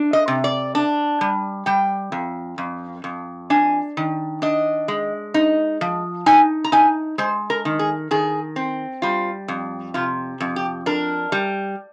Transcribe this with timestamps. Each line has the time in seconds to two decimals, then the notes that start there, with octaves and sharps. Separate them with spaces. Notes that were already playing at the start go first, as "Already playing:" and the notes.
Already playing: D4
0.13 D#5
0.28 C3
0.44 D5
0.75 D4
1.21 G3
1.66 G3 G5
2.12 F2
2.58 F2
3.04 F2
3.50 D4 G#5
3.97 D#3
4.42 D4 D#5
4.88 G#3
5.34 D#4
5.81 F3
6.26 D#4 G#5
6.64 A#5
6.72 D#4 G#5
7.18 G#3 C5
7.50 A#4
7.65 D#3
7.79 G#4
8.11 D#3 G#4
8.56 C4
9.02 G3 F4
9.48 F2
9.94 C3 F4
10.40 F2
10.56 G4
10.86 D4 A#4
11.32 G3